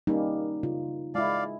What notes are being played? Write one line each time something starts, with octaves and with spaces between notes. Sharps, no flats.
G3 A#3 C#4 D#4
C#3 F4
G#3 E4 D5 F5